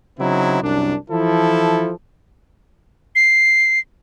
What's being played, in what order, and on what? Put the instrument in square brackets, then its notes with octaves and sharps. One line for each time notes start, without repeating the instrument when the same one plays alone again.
[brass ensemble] C#3 F#3 C4 D#4 E4
C2 F#2 D4
E3 F3 E4 A4
[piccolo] C7